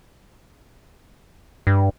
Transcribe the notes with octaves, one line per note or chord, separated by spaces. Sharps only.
G2